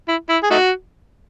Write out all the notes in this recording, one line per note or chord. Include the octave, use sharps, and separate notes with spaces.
E4
E4
G#4
A3 D#4 F#4